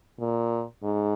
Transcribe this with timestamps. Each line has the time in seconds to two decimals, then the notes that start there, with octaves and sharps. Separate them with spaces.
0.20 A#2
0.83 G#2